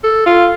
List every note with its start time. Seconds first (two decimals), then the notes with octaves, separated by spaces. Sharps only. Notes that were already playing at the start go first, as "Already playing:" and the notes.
0.04 A4
0.26 F4